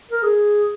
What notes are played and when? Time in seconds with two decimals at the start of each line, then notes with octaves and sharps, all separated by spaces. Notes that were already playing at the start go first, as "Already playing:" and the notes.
0.11 A#4
0.22 G#4